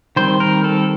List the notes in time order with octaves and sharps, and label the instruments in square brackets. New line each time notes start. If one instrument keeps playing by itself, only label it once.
[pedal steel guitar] D#3 G3 C4 C5
A#4
A4